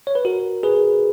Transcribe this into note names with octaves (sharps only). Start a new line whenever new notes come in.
C#5
B4
F#4 A#4
G#4 B4